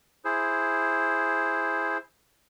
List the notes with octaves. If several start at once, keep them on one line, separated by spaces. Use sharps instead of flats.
E4 G#4 C5